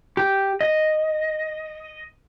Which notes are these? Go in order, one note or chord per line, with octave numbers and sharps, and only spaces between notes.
G4
D#5